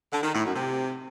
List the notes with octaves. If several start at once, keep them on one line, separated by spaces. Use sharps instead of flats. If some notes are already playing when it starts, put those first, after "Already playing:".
D3
D#3
A2
F#2
C3